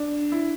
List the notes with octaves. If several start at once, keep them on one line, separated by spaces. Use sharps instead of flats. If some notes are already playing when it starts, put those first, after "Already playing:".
Already playing: D4
E4